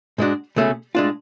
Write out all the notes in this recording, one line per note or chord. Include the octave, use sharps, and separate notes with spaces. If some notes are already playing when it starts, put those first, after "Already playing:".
G#2 G#3 D4 F#4
C#2 B2 A3 C#4 G#4
A2 G#3 D4 F4